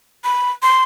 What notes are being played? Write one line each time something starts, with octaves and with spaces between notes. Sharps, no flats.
B5
C6